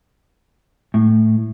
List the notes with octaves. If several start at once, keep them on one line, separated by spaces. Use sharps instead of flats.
A2